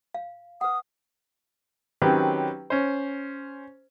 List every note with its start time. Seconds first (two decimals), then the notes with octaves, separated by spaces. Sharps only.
0.14 F5
0.61 B4 F#5 D#6
2.02 D#3 F#3 C4 C#4 G4 B4
2.70 C#4 C5